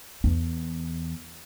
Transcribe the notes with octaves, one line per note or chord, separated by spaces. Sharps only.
E2